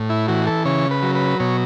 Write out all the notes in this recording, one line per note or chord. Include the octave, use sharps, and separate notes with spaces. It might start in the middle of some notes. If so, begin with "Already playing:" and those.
Already playing: A2
E4
E3 F#4
A4
C#3 C#5
B4
F#3
B4
B2 C#5